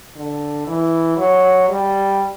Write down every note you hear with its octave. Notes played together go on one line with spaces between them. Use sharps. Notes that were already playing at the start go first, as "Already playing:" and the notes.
D3
E3
F#3
G3